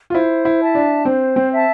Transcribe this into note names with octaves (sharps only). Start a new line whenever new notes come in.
F4
E4 C5
E4
E5 A5
D4
C4 C5
C4
E5 A5